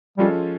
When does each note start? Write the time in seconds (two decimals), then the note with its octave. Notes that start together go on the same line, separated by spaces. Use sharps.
0.18 F3 G3 G#3 C#4 F4 A4